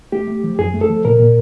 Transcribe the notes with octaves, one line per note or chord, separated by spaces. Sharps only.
A3 G4
A3
F3
F#2 G#4
A3
A4
F3
A#2 A#4
A#2